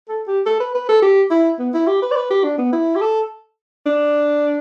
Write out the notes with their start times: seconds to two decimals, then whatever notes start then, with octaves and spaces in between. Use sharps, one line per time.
0.09 A4
0.27 G4
0.46 A4
0.60 B4
0.74 B4
0.89 A4
1.02 G4
1.30 E4
1.59 B3
1.74 E4
1.87 G4
2.02 B4
2.11 D5
2.16 B4
2.30 G4
2.44 D4
2.58 B3
2.72 E4
2.95 G4
3.01 A4
3.86 D4